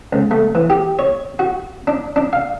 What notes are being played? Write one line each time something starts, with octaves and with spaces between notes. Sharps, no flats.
C#2
A3
E3
G4
C#5
F#4
D4
D4
F5